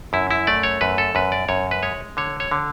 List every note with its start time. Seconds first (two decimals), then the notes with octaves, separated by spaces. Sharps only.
0.13 F#2 E4
0.31 E4
0.47 A3 D5
0.63 C#5
0.81 F#2 B4
0.98 A4
1.15 F#2 B4
1.32 D5
1.49 F#2 C#5
1.71 B4
1.83 G#3 C#5
2.17 D3 C#5
2.40 C#5
2.51 D3